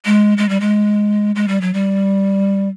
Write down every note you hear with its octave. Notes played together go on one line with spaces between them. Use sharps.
G#3
G#3
G3
G#3
G#3
G3
F#3
G3